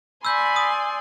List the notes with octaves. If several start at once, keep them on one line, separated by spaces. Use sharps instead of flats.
D5 G#5 B5 C6 E6 G6
D#6